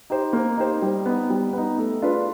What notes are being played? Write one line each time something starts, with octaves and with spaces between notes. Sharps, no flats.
D#4 G4 C5
A#3
D#4 G4 C5
G3
B3 D#4
G3
B3 D#4
A3
D4 F4 G#4 B4